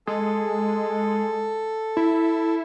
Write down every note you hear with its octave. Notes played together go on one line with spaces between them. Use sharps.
G#3 A4
E4